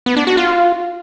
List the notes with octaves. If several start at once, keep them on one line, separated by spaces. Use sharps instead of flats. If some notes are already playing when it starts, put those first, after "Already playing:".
B3
D4
F#4
F4